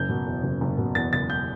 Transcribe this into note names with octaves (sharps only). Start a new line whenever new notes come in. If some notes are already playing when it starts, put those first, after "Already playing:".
Already playing: F#1 G6
B2
E2
F#1
F#1
B2
E2 A6
F#1 A6
G6